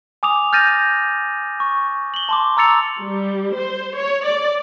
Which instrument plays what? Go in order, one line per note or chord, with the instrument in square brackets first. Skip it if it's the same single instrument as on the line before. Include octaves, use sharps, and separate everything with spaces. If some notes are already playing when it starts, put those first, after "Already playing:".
[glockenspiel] G#5 D6 D#6 F7
F6 G6 A6 A#6 D#7
C#6
F#7 G7
A5 C6 D6
A#5 D6 E6 A6 C#7 F7
[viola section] G3
C5
C#5
D5